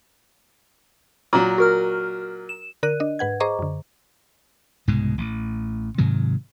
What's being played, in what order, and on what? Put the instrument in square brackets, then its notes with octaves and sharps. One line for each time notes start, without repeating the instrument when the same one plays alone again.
[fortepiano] A#2 F#3
[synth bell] F#4 A#4 F6
E7
[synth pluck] D3 A#4 D5 F#6 D#7
D4 D#5
G#2 B4 F#5 G#6
G#4 C5 D#5 A#5 C#6 D6
F#2 D3
[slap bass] C2 G#2 B2 G#3
A1
G#2 C3 D#3 F#3